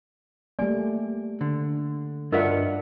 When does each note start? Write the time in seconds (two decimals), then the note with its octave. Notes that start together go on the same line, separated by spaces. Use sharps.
0.59 G3 A3 A#3 D5 G#5
1.41 D3
2.32 G2 D4 F4 A#4 B4 D#5 E5 F#5